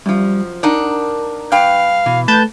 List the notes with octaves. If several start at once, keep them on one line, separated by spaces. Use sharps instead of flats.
F#2 F3 G3
D4 D#4 A#4 F#5
G2 B4 F5 G5
B2 E3
A3 B4 A5 G6